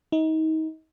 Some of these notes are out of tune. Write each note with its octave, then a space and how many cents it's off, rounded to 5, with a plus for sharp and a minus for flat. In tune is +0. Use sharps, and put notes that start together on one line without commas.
D#4 +30